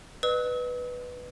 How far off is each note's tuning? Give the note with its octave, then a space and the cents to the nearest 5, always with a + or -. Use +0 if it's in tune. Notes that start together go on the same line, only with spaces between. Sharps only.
B4 +0 D#5 -40 E6 -45